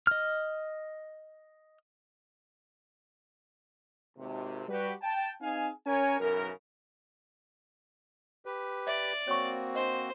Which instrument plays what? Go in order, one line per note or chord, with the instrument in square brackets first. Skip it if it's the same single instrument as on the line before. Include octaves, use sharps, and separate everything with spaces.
[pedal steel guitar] D#5 F6
[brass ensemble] G#1 D#2 C3
G3 F#4 G4 B4
G5 A5
C4 D#4 G#4 F5 G#5
C#4 A#4 C#5 G#5
B1 F#2 C#3 E3 B3 A#4
[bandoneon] G4 B4
[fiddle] D5 [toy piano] E5
[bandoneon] A#3 C4 F#4 [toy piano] C#5 C#6
[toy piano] D4 D#5 [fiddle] C5